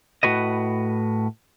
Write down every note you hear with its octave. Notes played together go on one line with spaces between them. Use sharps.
A2 F#4 B4 D#5